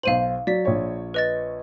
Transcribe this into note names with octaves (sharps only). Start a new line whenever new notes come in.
B1 C5 F5 D#7 F#7
F#3 D5 B6
A#1 C#5
B4 D#5 A6